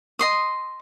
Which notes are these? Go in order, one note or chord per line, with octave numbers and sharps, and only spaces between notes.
D#5 C6 D#6